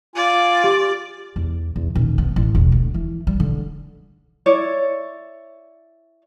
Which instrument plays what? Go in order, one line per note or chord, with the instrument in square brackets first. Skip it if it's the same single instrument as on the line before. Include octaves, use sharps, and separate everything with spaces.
[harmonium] F4 G#5 [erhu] D5
[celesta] G4
[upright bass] E2
E2
D#1
B3
A1
E1
D2
E3
G3
D3
[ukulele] E4 C#5 D5